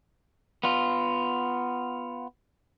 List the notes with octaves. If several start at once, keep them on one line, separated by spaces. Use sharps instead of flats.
B3 F4